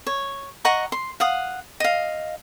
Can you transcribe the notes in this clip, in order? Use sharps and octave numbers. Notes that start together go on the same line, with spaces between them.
C#5
D#5 F#5 A#5 C#6
C6
F5 F#5 D#6
D#5 F5